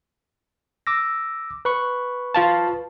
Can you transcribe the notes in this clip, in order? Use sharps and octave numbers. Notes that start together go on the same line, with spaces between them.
D6 E6 A#6
B4 B5 C#6
F4 F5 A5